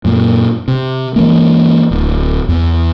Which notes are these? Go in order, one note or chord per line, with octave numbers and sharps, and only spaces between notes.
F#2 A#2
C3
E3 G#3 A#3
D1
E2